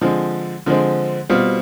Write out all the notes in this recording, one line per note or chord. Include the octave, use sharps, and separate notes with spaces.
D3 F3 G#3 C4
D3 F3 G#3 C4
B2 G3 C4 F4